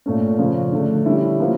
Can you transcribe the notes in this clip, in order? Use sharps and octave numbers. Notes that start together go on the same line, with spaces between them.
A#2 A3 C#4
C#3 F3 C#4
D3 A3 D4
D3 G3 C#4 E4
F3 A#3 C#4